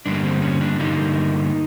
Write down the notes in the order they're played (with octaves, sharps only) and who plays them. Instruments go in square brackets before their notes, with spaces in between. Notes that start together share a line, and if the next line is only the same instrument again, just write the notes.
[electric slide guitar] G2 D3 G3 A#3 D4
C4
C#4
D4
G2 D3 G3 A#3 D#4